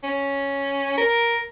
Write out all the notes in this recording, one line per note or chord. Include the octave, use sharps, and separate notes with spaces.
C#4
A#4